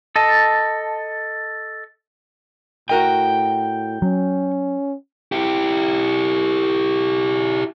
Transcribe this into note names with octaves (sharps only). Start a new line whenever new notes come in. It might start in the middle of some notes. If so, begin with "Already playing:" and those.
A4 D#5 A5
A2 F#4 A#4 D#5 G5
F#3 C#4
E4 G4